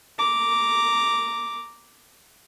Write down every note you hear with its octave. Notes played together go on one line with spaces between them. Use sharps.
A#5 D6